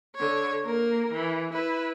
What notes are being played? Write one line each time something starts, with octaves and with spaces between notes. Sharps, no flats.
D3 C#5
A#3 A#4
E3
E4 B4